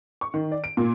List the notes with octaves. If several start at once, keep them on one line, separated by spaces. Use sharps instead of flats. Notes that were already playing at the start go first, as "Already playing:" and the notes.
C#6
D#3
D5
D7
A#2